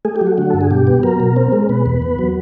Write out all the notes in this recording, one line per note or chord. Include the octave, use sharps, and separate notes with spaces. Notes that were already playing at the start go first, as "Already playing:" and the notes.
A3 G#4
G4
F#3
F#4
D3 F#4
G2 A4
G#4
B2 G4
B3
F#3 A#4
B2
C4
G#3
B2 B4
E2
B3
F#3